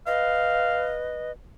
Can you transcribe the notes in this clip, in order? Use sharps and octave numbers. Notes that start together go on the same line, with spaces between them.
B4 D#5 F5